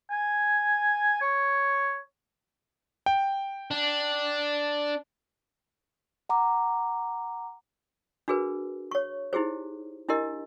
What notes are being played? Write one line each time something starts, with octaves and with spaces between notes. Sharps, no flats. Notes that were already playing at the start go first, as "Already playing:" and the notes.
G#5
C#5
G5
D4
F#5 A#5 D6
D4 F#4 G#4 A#4 B4
C#5 C#6
D#4 E4 G4 G#4 C5
D4 E4 G4 A#4 D#5